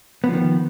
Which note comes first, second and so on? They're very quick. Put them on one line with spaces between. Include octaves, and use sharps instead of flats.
B3 F3 D#3